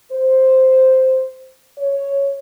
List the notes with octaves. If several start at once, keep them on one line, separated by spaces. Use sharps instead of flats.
C5
C#5